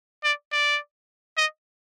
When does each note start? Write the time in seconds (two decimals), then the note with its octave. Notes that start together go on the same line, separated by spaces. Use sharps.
0.24 D5
0.52 D5
1.37 D#5